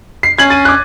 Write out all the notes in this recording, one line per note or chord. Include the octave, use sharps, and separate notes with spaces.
C7
C#4 G#6 F#7
A6 D#7
D6 F#6